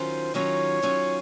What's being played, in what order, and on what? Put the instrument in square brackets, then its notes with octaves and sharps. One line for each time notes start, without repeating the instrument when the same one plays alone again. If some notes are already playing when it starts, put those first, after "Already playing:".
Already playing: [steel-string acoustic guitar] D#3 F#3 C#4 F4 [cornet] C5
[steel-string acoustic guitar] D#3 F#3 C#4 F4 [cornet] C#5
[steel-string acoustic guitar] D#3 F#3 C#4 F4